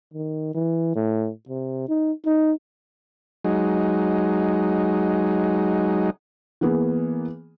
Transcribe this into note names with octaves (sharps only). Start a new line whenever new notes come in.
D#3
E3
A2
C3
D#4
D#4
F#3 G#3 D#4
E3 A#3 B3 G#4